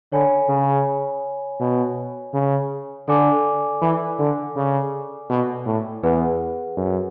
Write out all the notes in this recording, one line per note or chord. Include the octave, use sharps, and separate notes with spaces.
D3 C#5 G#5 B5
C#3
B2
C#3
D3 A4 D5 G#5 D6
E3
D3
C#3
B2
A2
E2 G#4 B4 F#5
F#2